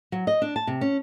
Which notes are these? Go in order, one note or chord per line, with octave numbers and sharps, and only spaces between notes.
F#3
D#5
D4
A5
C3
C#4